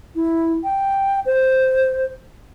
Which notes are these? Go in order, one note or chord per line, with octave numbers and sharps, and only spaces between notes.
E4
G5
C5